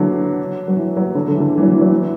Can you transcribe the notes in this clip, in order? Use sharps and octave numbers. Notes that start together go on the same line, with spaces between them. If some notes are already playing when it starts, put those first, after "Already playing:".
Already playing: D3 E3 F#3
F#3
E3
F#3
D3
D3
E3
D3
E3
F#3
E3
F#3
E3